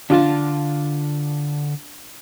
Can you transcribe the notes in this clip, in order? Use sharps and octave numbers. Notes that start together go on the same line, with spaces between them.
D3 D4 F4 A5